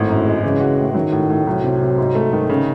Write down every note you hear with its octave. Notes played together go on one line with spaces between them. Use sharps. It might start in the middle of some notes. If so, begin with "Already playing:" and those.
Already playing: G#1 A2
F#2
G#3
C#3 E3
F#4
A2
D#3 F#3
A2
A2
C2 F#3
C3
C3
G#2
A3
D#3
C#3